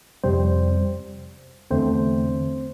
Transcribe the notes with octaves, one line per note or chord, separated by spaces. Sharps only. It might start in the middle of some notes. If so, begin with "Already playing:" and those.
F2 C3 G3 C4 C5
E2 D3 A3 C4 C5